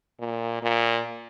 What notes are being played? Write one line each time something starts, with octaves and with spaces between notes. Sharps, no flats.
A#2
A#2